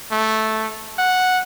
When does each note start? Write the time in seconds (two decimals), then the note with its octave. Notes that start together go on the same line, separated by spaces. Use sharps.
0.11 A3
0.99 F#5